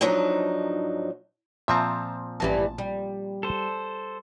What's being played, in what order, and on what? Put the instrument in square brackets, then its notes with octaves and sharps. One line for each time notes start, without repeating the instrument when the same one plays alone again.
[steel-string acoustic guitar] G#2 F3 F#3 D4 D#4
[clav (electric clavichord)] A#2 F3 C4 [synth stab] E5 A5 A#5
[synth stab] A1 A5 [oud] G2 E3 G3
[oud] G3
[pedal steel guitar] A4 C5